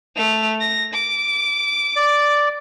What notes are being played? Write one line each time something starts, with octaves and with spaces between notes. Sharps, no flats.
A3 F7
A#6
D6
D5